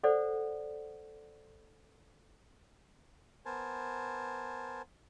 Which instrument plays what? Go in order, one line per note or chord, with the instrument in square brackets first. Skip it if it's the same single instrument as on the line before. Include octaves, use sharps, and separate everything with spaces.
[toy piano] A4 C5 D5 F#5
[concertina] B3 A#4 C5 G#5 A5